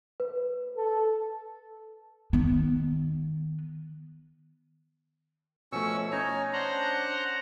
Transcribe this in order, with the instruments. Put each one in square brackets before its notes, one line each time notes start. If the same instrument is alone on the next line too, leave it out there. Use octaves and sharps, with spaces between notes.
[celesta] B4
[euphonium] A4
[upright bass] D#3 B3
[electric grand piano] B2 F3 A3 [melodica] C#4 C#6 E6
[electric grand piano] C#4 C#5 [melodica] D#4 G#5 A#5
[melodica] D4 [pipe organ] C5 F#5 A#5